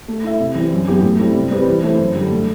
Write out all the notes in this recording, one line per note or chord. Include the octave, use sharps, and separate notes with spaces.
A3
E4 A4 E5
C3
E3 G3 C4
F#2
F#3 B3 E4 G4
A2
G3 C4 E4 A4
C3
G3 C4 G4 B4
E3
A3 E4 A4 C5
F#2
D3 G3
A3